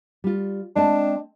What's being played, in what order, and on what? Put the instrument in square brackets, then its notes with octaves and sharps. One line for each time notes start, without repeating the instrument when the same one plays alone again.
[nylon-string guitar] G3 F4
[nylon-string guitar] G#3 C4 A5 [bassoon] D4